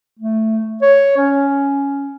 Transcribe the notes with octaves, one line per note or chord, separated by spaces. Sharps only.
A3
C#5
C#4